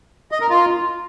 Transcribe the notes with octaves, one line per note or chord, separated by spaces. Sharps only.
D#5
A#4
F4